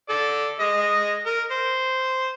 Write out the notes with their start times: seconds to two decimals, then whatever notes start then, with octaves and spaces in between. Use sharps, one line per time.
0.10 A4 D5
0.60 G#3 D#5
1.26 A#4
1.51 C5